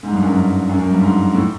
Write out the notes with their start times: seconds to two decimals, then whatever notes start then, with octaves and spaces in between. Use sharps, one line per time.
0.03 G#2
0.12 G2
0.23 F#2
0.32 G2
0.69 F#2
0.79 F#2
0.91 G2
1.02 G#2
1.35 A2